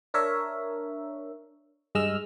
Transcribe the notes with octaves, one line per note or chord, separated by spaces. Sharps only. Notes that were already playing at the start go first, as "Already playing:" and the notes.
D4 A#4 C#5 E5
G2 G#3 D#5 E6 F6